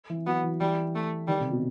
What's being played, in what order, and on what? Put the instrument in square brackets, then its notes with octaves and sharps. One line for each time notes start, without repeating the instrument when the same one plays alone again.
[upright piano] E3
[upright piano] F#3 [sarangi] B3
[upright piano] E3
[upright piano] E3 [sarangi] G3
[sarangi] A3
[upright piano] D#3 [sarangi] G3
[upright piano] C3
B2